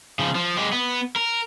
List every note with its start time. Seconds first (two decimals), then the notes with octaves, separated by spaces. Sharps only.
0.19 C#3 F3
0.35 F3
0.57 G#3 G4
0.72 B3
1.16 A#4